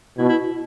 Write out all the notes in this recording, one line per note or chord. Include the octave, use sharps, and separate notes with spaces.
B2 E4
E4